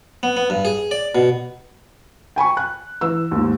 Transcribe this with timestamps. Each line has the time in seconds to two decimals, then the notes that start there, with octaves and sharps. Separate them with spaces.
0.23 B3
0.37 B3
0.50 G2
0.65 G#4
0.91 D5
1.15 B2
2.36 G5 G#5 B5 C#6
2.57 F#6
3.01 E3 E6
3.31 D#2 G#2